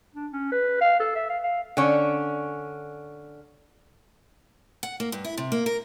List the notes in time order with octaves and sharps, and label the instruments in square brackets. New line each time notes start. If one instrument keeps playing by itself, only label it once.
[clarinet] D4
C#4
B4
F5
A4
E5
F5
F5
[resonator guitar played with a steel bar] D3 C#4
[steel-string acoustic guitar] F#5
A#3
G2
E4
C3
A#3
A#4